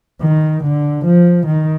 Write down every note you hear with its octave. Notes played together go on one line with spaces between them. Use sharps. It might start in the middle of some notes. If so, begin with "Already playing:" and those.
D#3
D3
F3
D#3